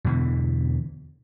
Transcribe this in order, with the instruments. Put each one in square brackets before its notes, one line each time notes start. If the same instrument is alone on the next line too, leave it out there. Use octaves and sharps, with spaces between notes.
[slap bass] E2 B2 D3 E3